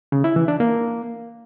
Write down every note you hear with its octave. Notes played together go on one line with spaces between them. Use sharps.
C#3
E4
E3
D4
A#3